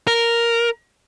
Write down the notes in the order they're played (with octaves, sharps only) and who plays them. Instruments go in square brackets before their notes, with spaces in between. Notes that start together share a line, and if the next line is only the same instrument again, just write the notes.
[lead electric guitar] A#4